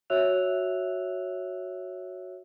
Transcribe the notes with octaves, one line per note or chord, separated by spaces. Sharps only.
F#4 C#5 E5 E6 F#6 F7